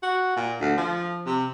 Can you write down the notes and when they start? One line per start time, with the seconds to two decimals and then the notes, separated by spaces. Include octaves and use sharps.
0.03 F#4
0.36 A#2
0.61 D2
0.78 F3
1.26 C3